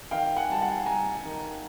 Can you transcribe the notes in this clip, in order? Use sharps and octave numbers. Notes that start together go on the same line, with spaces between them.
D#3 F5 G5
F#5 G#5
G3 A5
F#5 G#5
G3 G#5 A#5
D#3